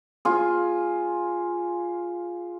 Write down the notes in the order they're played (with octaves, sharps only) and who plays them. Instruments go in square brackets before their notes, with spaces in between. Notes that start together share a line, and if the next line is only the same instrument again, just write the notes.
[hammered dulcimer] F4 G#4